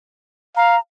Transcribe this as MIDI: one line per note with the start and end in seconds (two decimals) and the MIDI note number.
0.57 0.76 77
0.57 0.79 82